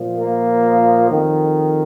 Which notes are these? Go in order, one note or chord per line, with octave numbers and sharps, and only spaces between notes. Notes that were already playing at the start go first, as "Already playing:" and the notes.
Already playing: A#2 F3
A#3
F2 D#3